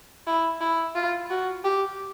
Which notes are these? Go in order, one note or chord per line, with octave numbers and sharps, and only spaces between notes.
E4
E4
F4
F#4
G4